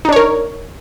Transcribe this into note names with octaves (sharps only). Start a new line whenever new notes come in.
D4 D#4 A#4 C#5